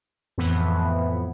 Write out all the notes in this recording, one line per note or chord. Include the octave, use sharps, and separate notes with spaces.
F2 A2 E3 B3